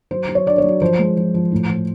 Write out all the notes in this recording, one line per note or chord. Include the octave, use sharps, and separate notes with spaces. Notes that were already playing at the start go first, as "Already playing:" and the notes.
F#3 C5
F#3
C#5
D4 D5
C#5
F#3
F3 C5
G#3
F3
F3
A2
F3